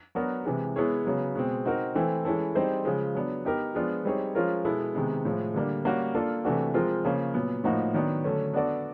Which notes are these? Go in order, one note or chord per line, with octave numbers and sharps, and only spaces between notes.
F#3 B3 D4 F#4 A#4
C3 E3 G#3
G#3 B3 E4 G#4 C#5
C#3 F#3 B3
B2 G#3 C4
C4 D#4 F#4 A#4
E3 A3 C4 E4
E3 G#3 C#4 E4 A4
G3 C4 D#4 G#4 C5
C#3 F3 G#3
F#3 B3 D4
B3 D#4 G4 A#4
F3 G#3 B3 D4 F4
G3 C4 D#4 G#4 C#5
F3 G#3 C#4 F4 A#4
B2 G#3 B3 E4 A4
C3 D#3 G#3 B3
A2 F3 G#3
D3 G3 A#3 D4
G3 A#3 C#4 F#4
A#3 D4 F4 A4
C3 E3 A3 D4 F#4
F3 G#3 C4 F4 A#4
C#3 F3 A#3 C#4
A#2 F#3 B3
A2 F3 A#3 D#4 F#4
D#3 F#3 B3 D4
D3 F#3 A3 C#4
B3 D4 F#4 A4 D5